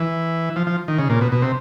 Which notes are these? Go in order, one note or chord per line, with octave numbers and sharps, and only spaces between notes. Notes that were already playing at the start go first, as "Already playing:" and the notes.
Already playing: E3
F3
F3
D#3
C#3
A#2
B2
B2
C3